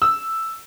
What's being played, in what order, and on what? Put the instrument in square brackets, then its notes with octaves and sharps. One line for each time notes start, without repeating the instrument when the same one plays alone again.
[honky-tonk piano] E6